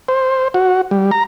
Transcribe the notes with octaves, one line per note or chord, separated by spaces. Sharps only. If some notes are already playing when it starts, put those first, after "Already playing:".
C5
F#4
G3
A#5